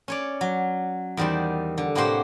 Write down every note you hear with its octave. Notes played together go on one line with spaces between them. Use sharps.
C#4 C#5 D5
F#3
E2 D#3 G3 C5 D5
D3
A2 C3 A#3 G4 C5 F#5